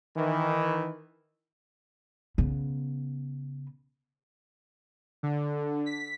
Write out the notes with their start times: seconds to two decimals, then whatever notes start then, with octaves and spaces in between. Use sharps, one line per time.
0.16 D#3 E3
2.38 C#3 B3
5.23 D3
5.86 B6